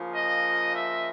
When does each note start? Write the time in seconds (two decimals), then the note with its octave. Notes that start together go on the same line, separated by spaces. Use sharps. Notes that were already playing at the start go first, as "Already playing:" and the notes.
Already playing: C#3 F3 A#3
0.11 D#5
0.74 E5